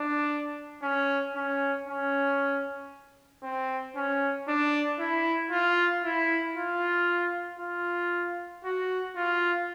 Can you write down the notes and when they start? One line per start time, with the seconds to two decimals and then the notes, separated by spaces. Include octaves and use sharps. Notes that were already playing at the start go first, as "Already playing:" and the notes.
Already playing: D4
0.82 C#4
1.36 C#4
1.88 C#4
3.43 C4
3.96 C#4
4.48 D4
4.99 E4
5.51 F4
6.04 E4
6.56 F4
7.59 F4
8.65 F#4
9.16 F4